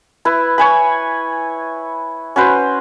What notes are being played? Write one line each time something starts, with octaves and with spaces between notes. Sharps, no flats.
E4 B4
C#5 G#5 B5
C#4 F#4 B4 C5